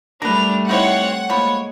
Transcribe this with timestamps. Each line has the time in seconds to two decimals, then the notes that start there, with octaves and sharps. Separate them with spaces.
0.22 G3 A3 D4 A#4 B4 F7
0.69 C4 D#4 E4 C5 C#5 F#5
1.30 F3 G#3 A#3 C#5 B5